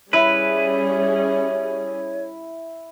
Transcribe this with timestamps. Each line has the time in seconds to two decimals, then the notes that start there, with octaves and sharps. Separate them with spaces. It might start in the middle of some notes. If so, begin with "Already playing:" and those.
0.13 G3 C#4 E4 G#4 B4 C#5